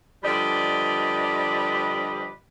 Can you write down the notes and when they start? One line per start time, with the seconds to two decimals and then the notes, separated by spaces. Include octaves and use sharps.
0.24 D3 F3 G3 B4 D5 D#5